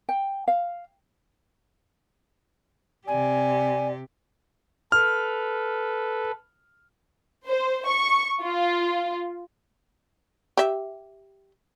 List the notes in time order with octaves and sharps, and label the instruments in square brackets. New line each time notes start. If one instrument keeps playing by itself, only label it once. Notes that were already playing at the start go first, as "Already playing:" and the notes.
[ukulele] G5
F5
[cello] C3 G4 [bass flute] D5 [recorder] G#5
[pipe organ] A4 B4 [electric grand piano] F6
[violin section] C5
C#6
F4
[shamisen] G4 E5